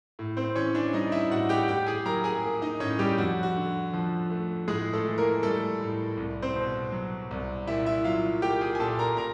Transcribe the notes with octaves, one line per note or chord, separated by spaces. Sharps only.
A2
C4 C5
E3 C#4 C#5
D4 D5
G3 D#4 D#5
E4 E5
A2 F#4 F#5
G4 G5
A2 G4 G5
G#4 G#5
F#3 A#4 A#5
G#4 G#5
A#3
D#4 D#5
A2 C#4 C#5
G3 G4
F2 F#4
F#4
D3
F3
A3
A2 G#3 G#4
A3 A4
E3
A#3 A#4
G3 A3 A4
A2
C2
C4 C5
B2
F#3
C2
A#2 E4 E5
E4 E5
F#3 F4 F5
A#3 G4 G5
G#4 G#5
G#5
A#2 A4 A5
A#4 A#5
A#2 A#4 A#5